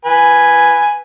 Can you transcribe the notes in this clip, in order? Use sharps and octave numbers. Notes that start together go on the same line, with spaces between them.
B4 G#5